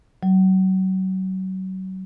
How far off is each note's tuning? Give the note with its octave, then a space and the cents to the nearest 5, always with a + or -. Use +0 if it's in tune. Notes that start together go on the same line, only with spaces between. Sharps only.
F#3 +30